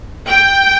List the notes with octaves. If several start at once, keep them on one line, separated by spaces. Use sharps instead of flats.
G5